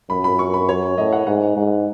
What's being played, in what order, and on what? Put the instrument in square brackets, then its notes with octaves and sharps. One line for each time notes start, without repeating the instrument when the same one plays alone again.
[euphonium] F#2 [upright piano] B5
[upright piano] B5
C#6
B5
C#5
[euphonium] A2 [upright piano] D#5
[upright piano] F#5
[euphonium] G#2 [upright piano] F#5
[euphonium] G#2